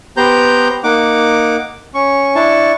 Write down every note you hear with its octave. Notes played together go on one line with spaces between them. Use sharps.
B3 G4 C5 A#5 G6
A#3 D#4 F#5 D6
C#4 C#6
D4 E4 A5 C#6